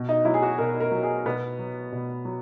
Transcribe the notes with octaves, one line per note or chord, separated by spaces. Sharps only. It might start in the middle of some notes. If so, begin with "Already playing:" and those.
Already playing: B2
D#4
F#3 E4
G#4
F#4
B2 A#4
A#4
F#3
G#4
B2 B3
F#3
B2
F#3